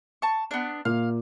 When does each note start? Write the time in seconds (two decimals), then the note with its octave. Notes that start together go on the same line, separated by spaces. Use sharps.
0.22 A5 C#6
0.51 B3 D4
0.85 A#2 F5